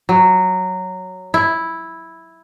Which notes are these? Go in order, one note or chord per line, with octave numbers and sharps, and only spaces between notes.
F#3
E4